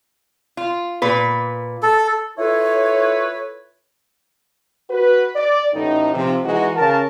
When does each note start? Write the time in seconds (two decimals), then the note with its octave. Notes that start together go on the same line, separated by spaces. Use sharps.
0.57 F4
1.02 A#2 B4
1.83 A4
2.38 E4 F4 A4 B4 C#5
4.90 F#4 B4
5.36 D5
5.74 A1 A2 D#4
6.14 C3 F3
6.45 E3 G#3 D#4 F#4
6.76 C#3 A#4 A5